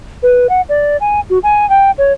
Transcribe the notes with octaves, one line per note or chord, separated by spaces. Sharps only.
B4
F#5
D5
G#5
F#4
G#5
G5
C#5